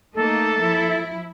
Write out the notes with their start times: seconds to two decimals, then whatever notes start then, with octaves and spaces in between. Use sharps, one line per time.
0.15 A3 A#3 D#4 A4
0.60 F3 E4